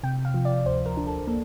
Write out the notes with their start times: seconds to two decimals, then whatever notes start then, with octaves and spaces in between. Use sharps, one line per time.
0.03 C3 G5
0.25 F5
0.34 F3
0.45 D5
0.66 D2 C5
0.86 A#4
0.97 D4
1.07 A4
1.27 A#3 A4